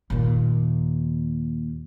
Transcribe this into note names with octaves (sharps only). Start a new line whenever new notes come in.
D#2 A#2